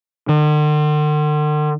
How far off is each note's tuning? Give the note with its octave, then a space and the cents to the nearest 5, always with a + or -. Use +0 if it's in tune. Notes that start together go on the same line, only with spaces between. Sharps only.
D3 +45